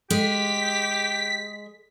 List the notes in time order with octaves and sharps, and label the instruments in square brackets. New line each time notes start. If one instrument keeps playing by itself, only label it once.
[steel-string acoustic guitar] G#3 [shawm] G4 [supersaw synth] B6